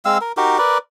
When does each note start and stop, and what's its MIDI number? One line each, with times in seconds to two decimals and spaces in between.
0.05 0.18 56
0.05 0.18 60
0.05 0.18 77
0.05 0.18 88
0.21 0.32 70
0.37 0.58 63
0.37 0.58 66
0.37 0.58 67
0.37 0.58 70
0.58 0.78 70
0.58 0.78 71
0.58 0.78 74